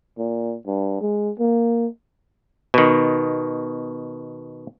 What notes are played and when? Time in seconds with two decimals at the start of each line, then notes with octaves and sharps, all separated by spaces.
0.18 A#2
0.66 G2
1.01 G#3
1.39 A#3
2.74 B2 D#3